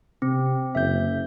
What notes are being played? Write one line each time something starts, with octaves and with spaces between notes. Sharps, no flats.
C3 C4
F#1 E5 G6